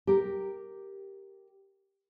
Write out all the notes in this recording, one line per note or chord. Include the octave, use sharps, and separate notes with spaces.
G4 A#4